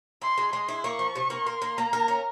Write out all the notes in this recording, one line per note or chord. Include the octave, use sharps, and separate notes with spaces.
E4 C6
G#3
G#3 C6
E4
A#3 C#6
F3
C3
A#3
A#4 C6
A#3
A#3 A#5
A#4
C#4